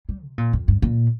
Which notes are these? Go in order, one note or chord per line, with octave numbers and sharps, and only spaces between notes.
G3
C3
A#2
F2
G2
A#2